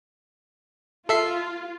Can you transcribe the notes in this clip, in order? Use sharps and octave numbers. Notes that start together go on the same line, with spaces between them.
F4 A4 E5 C7